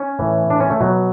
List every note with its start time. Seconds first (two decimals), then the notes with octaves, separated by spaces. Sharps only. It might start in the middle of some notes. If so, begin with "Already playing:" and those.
Already playing: C#4
0.19 A2 E3
0.50 D4
0.60 C#4
0.71 A3
0.81 B2 F#3